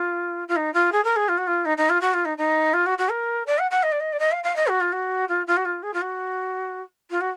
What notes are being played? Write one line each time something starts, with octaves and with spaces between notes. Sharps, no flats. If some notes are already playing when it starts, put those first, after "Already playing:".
Already playing: F4
F4
D#4
F4
G#4
A#4
G#4
F4
F#4
F4
D#4
D#4
F4
F#4
F4
D#4
D#4
F4
F#4
F#4
A#4
D5
F#5
F#5
D#5
D5
D#5
D5
D#5
F5
F5
D#5
F#4
F4
F#4
F4
F4
F#4
F4
G#4
F4
F#4
F4
F#4